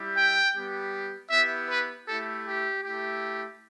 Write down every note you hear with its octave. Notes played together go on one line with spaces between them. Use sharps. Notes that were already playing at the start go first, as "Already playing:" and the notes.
Already playing: G3 E4 G4
G5
G3 B3 G4
B3 E4 G4 E5
B4
A3 E4 G4 A4
G4
A3 E4 G4